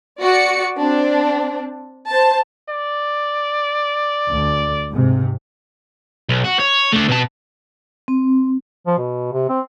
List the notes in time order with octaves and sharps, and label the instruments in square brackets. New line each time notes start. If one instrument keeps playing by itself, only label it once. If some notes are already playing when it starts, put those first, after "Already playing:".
[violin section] F#4 D5 C#7
C4 D4
C5 A5
[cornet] D5
[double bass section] D2
G#2 C3
[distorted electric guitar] B1
F#4
C#5
A3 D4
B2 A5
[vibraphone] C4
[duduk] F3
B2
C3
C4